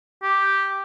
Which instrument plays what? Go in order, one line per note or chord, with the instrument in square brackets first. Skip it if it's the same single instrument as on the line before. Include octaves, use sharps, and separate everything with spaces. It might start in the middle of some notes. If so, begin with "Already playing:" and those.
[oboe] G4